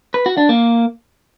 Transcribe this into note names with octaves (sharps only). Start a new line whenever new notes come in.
B4
F#4
D4
A#3